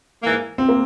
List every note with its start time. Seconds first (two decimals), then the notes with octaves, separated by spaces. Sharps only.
0.22 G#2 E3 A#3
0.58 C4
0.69 A#3